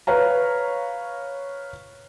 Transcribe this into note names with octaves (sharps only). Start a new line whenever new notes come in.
B4 C#5 F5 A#5